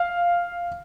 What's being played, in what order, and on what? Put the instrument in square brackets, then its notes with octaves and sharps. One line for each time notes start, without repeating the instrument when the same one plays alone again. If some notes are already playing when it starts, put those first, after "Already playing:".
Already playing: [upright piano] F5